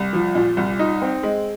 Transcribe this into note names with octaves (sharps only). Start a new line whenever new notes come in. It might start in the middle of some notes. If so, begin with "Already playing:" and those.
Already playing: C2
F3
A#2
C2
D#4
C4
G#3